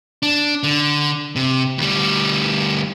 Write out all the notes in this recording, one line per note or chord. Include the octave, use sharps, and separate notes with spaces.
D4
D3
C3
D2 G3